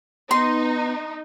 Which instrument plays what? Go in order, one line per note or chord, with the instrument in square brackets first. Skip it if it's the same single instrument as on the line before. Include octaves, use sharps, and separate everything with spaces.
[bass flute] B3 [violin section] D#4 [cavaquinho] C6